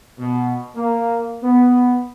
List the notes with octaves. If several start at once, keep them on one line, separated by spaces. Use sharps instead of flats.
B2
A#3
B3